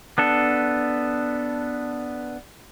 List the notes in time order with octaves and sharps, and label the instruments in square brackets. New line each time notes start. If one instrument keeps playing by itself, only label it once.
[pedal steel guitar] B3 D4 A4